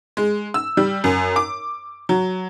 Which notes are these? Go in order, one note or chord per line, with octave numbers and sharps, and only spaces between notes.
G#3
E6
G3
F#2
D6
F#3